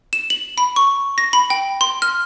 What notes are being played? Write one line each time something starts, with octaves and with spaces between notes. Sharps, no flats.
E7
F#7
B5
C#6
A#6
B5
G5
C6
F6